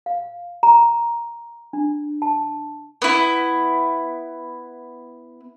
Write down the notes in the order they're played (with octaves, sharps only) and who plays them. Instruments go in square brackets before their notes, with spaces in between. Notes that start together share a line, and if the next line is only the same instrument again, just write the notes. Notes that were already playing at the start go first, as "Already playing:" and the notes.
[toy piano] F5
A#5
D4
A5
[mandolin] B3 E4